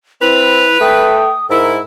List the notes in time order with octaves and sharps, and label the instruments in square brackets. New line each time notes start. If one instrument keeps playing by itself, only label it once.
[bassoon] C4 [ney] E4 [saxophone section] B4 [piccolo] F7
[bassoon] A3 [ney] G5 [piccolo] D#6
[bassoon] G#2 [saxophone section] E4 [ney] A#4 [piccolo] E6